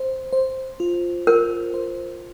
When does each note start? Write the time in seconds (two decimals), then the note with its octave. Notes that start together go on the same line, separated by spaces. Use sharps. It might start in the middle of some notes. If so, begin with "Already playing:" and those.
Already playing: C5
0.33 C5
0.80 F4
1.27 F4 A#4
1.74 C5